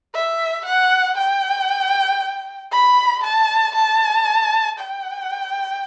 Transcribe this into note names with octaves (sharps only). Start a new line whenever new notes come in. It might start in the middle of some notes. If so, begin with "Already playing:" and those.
E5
F#5
G5
B5
A5
A5
G5